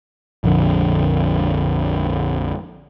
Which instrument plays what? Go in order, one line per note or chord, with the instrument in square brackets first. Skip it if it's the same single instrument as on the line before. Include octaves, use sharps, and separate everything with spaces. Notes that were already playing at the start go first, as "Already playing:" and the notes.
[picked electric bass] A#1 F2 D3